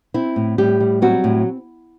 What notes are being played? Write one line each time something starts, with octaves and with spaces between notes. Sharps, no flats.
C4 E4
A2
A2 G3 G4
G3
F#3 C4 F#4
A2